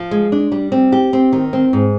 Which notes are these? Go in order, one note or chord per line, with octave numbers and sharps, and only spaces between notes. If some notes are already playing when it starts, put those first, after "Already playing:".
Already playing: F3
G#3
D4
G3
C4
G4
C4
D#3
C4
G#2